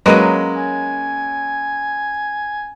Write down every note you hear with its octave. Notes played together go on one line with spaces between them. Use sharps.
F#3 G#3 A#3 C#4 B4 D#5
G#5